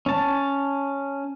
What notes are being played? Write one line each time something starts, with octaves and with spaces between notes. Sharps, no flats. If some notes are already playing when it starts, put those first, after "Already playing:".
C#4 A5